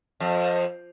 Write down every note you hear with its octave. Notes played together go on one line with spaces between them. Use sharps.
F2